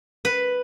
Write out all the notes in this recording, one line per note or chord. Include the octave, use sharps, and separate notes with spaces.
B4